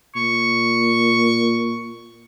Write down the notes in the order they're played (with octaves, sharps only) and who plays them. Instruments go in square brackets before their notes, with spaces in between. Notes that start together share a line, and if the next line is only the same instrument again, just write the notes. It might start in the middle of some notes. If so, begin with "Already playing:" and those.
[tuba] A#2 [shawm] C#6